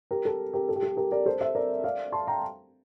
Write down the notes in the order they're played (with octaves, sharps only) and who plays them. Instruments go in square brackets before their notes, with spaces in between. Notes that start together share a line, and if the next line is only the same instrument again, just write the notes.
[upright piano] G4 A#4
A4
G4 A#4
A4
G4
A4
G4 A#4
A#4 D5
A4 C5
C5 E5
A#4 D5
D5 F5
A5 C6
G5 A#5